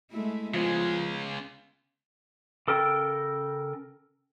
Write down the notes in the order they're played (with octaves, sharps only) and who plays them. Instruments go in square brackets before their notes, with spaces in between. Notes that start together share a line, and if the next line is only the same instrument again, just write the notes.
[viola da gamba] G#3 A3 E4
[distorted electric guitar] C#3 G#3 [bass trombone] F3 [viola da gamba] B3
[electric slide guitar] C#3 A4 A#4 G5